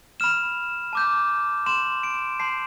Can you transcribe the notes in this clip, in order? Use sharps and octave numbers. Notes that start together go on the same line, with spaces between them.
B5 F6 E7
A5 D6 G6
C6 G6 E7
D7
A5 C6 G6 C7